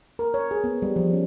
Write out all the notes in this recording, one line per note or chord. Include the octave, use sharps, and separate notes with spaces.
A#4
C#5
G#4
B3
G3
F3
C#4